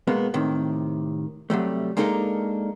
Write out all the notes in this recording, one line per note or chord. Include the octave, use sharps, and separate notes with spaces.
B2 G#3 A#3 B3
A2 C3 D#3
C3 F#3 G3 A3
G#3 A#3 D4 D#4 A4 A#4